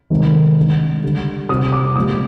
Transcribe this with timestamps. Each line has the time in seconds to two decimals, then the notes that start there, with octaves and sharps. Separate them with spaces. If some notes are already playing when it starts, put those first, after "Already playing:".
0.10 C3 D#3 G#3
0.57 D3 G#3
1.03 D3 G3
1.49 C3 G3 D#6
1.72 D6
1.95 A#2 F3 G#3 D#6